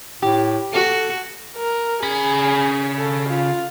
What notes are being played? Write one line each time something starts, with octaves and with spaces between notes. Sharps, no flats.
A2 G4
F#4 A4
A#4
C#3 G#4 B5
A4
F4